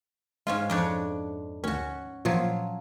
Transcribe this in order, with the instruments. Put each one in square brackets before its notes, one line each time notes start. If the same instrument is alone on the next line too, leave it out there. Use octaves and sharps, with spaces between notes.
[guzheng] G#2 C#4 F4 [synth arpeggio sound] G#3
[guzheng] F2 D4 C#5 [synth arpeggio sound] D6 F#6
[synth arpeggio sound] D2 D#3 [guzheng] C#4 F#4
[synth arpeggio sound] A#2 F4 G#6 [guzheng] F3 F#3